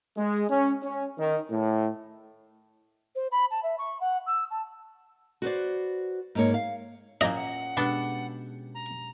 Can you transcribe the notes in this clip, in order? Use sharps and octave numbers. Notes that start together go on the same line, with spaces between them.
G#3
C#4
C#4
D#3
A2
C5
B5
A5
E5
C#6
F#5
E6
A5
F#4 B4 C5 D5
G#2 A#3 C#5
F5
A#2 A#3 C#4 E4 D#5 A#5
F#5
B2 G#3 B3 D4 G4 A4
A#5